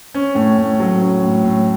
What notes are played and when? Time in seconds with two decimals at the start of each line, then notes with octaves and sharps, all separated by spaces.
0.14 C#4
0.35 A2
0.58 A2
0.80 F#3
1.01 C#4
1.23 A2
1.44 A2